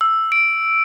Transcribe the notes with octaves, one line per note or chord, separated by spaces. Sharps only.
E6
D7